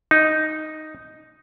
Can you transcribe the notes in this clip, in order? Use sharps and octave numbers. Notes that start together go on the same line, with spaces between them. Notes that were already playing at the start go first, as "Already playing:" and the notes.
D#4